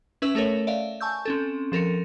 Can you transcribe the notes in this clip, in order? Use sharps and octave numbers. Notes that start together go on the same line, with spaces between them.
C#4 B4 E5 E6
A3 A4 A#4 C#5
D5 E5 F5
G#5 A5 C#6 E6 G6
C4 C#4 A4
F3 A4 A#4 C6 C#7